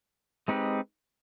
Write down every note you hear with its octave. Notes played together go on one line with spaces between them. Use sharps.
G#3 C4 D#4 G4 B4